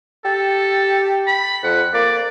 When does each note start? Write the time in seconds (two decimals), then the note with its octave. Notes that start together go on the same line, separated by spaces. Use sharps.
0.25 G4 A4
1.27 B5
1.63 F2 F#5
1.94 A#3 D5